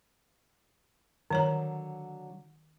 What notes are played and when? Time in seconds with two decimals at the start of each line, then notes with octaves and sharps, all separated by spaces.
1.30 D3 D#3 F#3 C#5 A#5